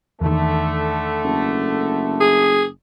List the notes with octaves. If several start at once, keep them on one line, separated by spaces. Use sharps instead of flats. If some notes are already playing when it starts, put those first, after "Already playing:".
E2 D3 D#3 A3
F#1
G#4